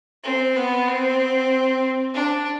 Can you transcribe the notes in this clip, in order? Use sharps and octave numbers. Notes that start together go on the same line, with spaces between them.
C4
B3
C4
D4